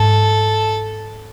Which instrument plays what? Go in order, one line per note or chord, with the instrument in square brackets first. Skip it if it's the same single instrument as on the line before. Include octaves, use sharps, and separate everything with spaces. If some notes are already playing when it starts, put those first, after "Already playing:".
Already playing: [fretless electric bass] G#2 [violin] A4